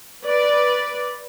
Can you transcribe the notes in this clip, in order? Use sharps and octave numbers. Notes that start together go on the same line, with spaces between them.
B4 D5